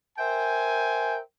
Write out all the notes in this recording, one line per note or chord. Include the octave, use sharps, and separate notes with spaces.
A#4 C5 E5 G5 G#5